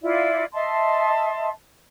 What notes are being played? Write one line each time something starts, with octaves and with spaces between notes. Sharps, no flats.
E4 F4 D5
D#5 E5 A5 C6